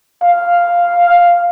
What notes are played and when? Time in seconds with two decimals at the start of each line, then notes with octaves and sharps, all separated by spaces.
0.23 F5